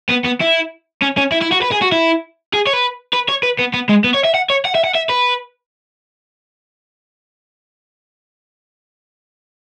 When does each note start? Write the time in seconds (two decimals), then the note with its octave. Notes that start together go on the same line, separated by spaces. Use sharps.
0.10 B3
0.26 B3
0.41 E4
1.02 C#4
1.17 C#4
1.32 E4
1.42 E4
1.52 F#4
1.63 B4
1.72 G#4
1.82 F#4
1.92 E4
2.53 G#4
2.67 C#5
2.73 B4
3.13 B4
3.29 C#5
3.43 B4
3.59 B3
3.74 B3
3.89 G#3
4.04 B3
4.14 C#5
4.24 E5
4.34 F#5
4.50 C#5
4.65 F#5
4.75 E5
4.84 F#5
4.95 E5
5.10 B4